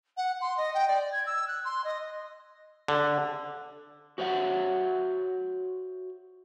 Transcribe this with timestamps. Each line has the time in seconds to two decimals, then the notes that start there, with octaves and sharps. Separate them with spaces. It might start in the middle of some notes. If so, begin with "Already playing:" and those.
0.17 F#5
0.41 C6
0.57 D#5
0.74 G5
0.88 D5
1.12 G#6
1.26 E6
1.48 F#6
1.65 C6
1.84 D#5
2.88 D3
4.18 F#4 C5 C#5 E5 F#5